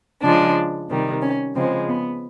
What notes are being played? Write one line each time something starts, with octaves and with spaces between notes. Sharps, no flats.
C#3 F3 G#3 D4
C3 D#3 G3
C#4
C#3 F3 G#3 C4
B3